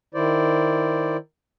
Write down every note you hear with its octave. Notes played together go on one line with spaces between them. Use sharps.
D#3 E4 C5 D5